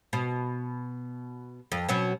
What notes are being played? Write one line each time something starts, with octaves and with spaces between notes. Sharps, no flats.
B2
F2
B2 F#3 C#4